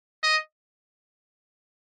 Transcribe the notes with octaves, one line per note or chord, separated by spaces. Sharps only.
D#5